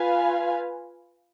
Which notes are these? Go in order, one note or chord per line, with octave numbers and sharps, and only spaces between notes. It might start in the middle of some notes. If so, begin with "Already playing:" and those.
Already playing: F4 B4 F5 G#5